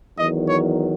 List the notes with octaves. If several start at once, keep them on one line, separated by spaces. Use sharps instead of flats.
E2 D#3 F#3 D#5
C#5